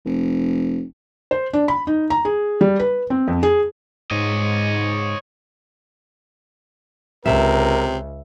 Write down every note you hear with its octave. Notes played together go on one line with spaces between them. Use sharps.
F1
C5
D4
B5
D#4
A#5
G#4
G3
B4
C4
F2
G#4
G#2 C#5 D#5
C#2 C3 A#4 E5